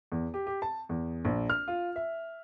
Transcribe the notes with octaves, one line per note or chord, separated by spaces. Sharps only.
E2
G4
G4
A5
E2
A#1
F6
F4
E5